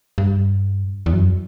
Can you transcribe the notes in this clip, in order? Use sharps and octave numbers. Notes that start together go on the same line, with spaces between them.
G2
E2
F#2